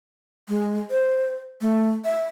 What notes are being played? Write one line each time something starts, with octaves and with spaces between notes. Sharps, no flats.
G#3
C5
A3
E5